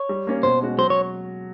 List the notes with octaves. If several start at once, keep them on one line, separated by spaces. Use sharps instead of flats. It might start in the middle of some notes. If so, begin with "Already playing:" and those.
Already playing: C#5
G3
A#3 C#4
B2 C5
G#3 C#4 F#4
F#3 C5
C#5